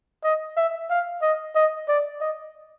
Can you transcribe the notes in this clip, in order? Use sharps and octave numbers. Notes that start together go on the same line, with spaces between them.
D#5
E5
F5
D#5
D#5
D5
D#5